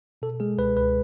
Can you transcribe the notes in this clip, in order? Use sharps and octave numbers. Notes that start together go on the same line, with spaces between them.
B2 A4
G#3 G#4
C#2 B4
C#2 B4